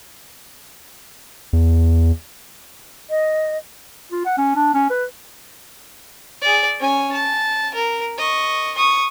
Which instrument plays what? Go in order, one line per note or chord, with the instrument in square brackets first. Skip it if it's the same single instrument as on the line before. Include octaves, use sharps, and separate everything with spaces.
[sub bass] E2
[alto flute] D#5
[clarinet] F4
F#5
C#4
D4
C#4
B4
[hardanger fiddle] G#4 D5
C#4 G#5
A5
A#4
D#5 C#6
C#6 D#6